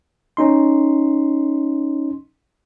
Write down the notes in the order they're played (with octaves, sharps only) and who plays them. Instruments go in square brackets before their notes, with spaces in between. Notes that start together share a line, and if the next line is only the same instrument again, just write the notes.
[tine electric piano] C#4 D#4 C6